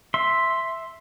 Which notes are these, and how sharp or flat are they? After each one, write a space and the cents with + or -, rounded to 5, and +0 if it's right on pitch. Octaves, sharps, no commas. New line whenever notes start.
E5 +0 C6 +0